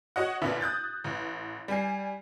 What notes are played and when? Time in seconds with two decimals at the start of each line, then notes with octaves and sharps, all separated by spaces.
0.16 F#4 C#5 D#5 F#5
0.42 A1 A#2 D3 B3 D4 E5
0.61 D#6 F#6 G6 A6
1.04 A1
1.68 G3 G#5 C7